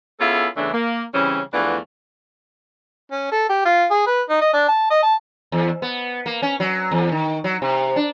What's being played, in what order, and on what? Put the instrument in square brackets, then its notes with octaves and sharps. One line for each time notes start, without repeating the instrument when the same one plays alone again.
[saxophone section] B3 C#4 E4 F4 G#4 A4
E2 C#3 E3 A3 D4
A#3
C#3 E3 G3 C4 C#4
E2 E3 F3 A3 B3 D4
[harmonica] C#4
A4
G4
F4
G#4
B4
D#4
D#5
D4
A5
D#5
A5
[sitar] E2
B3
A#3
C#4
F#3
E2
D#3
F#3
C3
D4